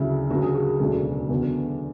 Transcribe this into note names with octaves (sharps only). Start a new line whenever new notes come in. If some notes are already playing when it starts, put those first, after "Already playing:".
Already playing: D2 C#3 F#3 E4
D2 C#3 F#3 F#4
G#4
F#4
G#4
E1 D2 C#3 F#3 A4
E2 D3 F#3